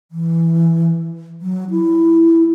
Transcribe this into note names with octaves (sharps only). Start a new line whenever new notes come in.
E3
F#3
E4